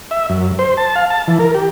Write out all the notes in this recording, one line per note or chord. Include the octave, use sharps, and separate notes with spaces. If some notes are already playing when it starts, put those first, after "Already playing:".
E5
F#2
C5
A5
F5
A5
E3
A#4
G4